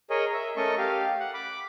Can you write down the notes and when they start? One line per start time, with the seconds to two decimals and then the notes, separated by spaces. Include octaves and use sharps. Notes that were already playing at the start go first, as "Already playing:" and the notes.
0.10 G#4 A#4 C#5 D#5
0.33 E5
0.57 A3 C#4 A4 A#4 D#5 C#6
0.78 G4 F5
1.20 F#5
1.34 B5 D6